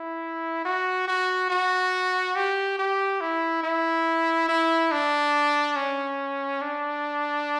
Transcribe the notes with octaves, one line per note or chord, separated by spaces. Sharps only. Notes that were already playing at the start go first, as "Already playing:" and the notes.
Already playing: E4
F#4
F#4
F#4
G4
G4
E4
E4
E4
D4
C#4
D4